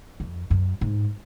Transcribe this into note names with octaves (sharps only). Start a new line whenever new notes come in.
F2
F#2
G#2